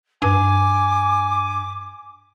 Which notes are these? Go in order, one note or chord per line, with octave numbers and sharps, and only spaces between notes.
G2 G#5 D6